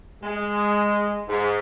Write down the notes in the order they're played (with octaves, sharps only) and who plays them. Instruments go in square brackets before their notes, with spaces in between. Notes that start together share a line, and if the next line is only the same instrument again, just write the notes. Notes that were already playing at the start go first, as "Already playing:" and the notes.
[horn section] G#3
G#2